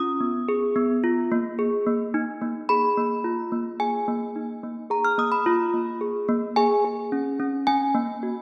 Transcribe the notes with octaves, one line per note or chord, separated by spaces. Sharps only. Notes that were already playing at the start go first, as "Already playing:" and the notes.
Already playing: C#4 F4 D#6
B3
G#4
B3
F4
A#3
G#4
A#3
D#4
A#3
G#4 B5
A#3
F4
A#3
G#4 G#5
A#3
D#4
A#3
G#4 A#5
F6
A#3 D#6
B5
F4
A#3
G#4
A#3
G#4 G#5
G#4
C#4
C#4
C#4 G#5
A#3
F#4